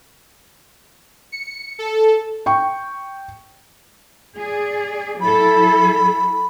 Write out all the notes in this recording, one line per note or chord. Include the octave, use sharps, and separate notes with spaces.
C#7
A4
G5 C#6
G#4 D5
F#3 E4 A4 B5